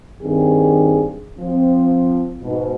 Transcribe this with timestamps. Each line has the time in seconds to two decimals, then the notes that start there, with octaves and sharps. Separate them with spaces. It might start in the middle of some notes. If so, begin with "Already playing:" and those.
0.21 G2 D#3 C4 G#4
1.39 F3 C4
2.41 G#2 B2